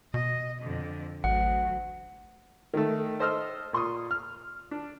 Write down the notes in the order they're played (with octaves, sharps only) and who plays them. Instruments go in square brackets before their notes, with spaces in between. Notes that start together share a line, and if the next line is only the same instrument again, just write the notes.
[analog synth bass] B2 [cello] D#5
[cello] F2 D3
[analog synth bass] A1 [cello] D2 F#3 [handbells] F#5
[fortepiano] D#3 A3
A4 C5 D#5 E6 F6
A#2 C6 C#6 D#6
F6
D4